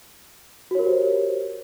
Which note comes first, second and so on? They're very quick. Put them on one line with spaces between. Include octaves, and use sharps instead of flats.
F#4 C#5 A#4 G4 C5